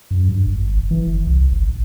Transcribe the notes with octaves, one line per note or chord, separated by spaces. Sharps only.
F#2
G2
G#1
F#1
E3
F#1
C2
G1
A1